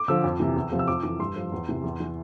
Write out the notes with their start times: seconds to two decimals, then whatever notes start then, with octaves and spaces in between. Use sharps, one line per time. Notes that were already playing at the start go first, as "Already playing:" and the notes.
Already playing: D6
0.08 D3 F3 E6
0.24 F2
0.40 C3 E3
0.56 E2
0.72 C3 F3
0.79 E6
0.88 F2 D6
1.03 E3 D6
1.19 G2 C6
1.36 F3
1.52 E2
1.68 C3 E3
1.84 E2
2.00 E3